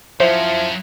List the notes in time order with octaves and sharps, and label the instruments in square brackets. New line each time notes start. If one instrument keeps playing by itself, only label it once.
[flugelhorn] F3 [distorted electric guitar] F#3 C#4 [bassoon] E4 [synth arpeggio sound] C5